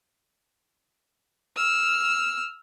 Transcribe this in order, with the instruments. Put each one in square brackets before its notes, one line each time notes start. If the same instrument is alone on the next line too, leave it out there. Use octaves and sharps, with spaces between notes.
[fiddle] E6 F6